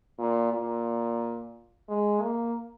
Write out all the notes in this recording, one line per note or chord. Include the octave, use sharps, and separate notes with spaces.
A#2
A#2
G#3
A#3